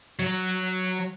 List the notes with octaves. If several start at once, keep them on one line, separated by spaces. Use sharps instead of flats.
F#3